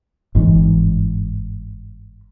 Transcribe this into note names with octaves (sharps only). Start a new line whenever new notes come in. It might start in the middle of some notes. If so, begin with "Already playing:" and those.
G1 G#2 E3